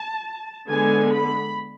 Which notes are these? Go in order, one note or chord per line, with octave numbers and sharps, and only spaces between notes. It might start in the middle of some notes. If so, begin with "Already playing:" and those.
Already playing: A5
D3 G#3 B3 G#5
B5